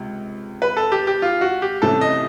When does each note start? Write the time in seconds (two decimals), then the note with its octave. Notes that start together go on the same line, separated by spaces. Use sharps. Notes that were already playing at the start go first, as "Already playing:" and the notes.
Already playing: C#2 C3
0.62 B4
0.77 A4
0.92 G4
1.07 G4
1.22 F4
1.41 F#4
1.62 G4
1.82 C2 C3 E3 A3 C#4 A4
2.01 D#5